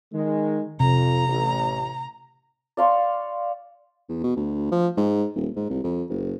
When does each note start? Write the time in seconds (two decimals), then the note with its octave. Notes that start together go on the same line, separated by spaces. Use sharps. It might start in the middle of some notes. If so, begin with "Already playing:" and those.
0.12 D#3 G#3
0.80 F2 C3 A#5
1.26 A1
2.77 D5 F5 C6 C#6
4.09 E2
4.24 B2
4.36 D2
4.72 F3
4.97 G#2
5.35 D#1
5.56 G#2
5.70 C2
5.84 F2
6.10 F#1